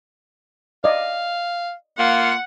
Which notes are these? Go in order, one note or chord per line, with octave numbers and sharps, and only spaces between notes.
D5 D#5 F5
A#3 F4 F#5